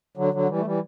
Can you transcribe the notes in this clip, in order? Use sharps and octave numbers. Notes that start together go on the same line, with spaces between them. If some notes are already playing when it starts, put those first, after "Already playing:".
D3 F#3
D3 F#3
E3 G3
A3
E3 G3